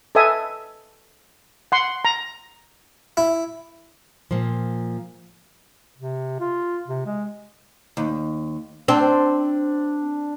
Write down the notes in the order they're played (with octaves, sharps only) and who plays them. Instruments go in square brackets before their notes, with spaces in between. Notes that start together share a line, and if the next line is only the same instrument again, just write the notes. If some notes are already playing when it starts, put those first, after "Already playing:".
[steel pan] A4 B4 D#5 E5 G#5 D#6
F#5 C6
A#5
[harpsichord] E4
[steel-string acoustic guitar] A#2 F3
[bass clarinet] C3
F4
C3
G#3
[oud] D#2
[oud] C4 [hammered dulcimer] D4